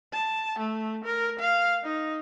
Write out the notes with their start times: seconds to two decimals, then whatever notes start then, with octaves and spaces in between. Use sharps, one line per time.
0.13 A5
0.59 A3
1.05 A#4
1.39 F5
1.84 D#4